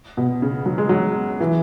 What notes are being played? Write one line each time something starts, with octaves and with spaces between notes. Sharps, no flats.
B2
C#3
F#3
G#3
F#3
E3